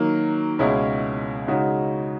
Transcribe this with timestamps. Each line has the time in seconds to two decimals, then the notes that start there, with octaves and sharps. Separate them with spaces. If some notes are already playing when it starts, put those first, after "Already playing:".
Already playing: D#3 F#3 A#3
0.59 C#2 B2 G#3 C#4 E4
1.48 C#3 G#3 D#4 F#4